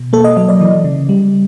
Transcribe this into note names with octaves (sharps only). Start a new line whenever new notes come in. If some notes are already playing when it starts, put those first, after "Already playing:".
Already playing: B2
A#3 A4
D#5
F#3 D#5
D5
E3
C#3
G3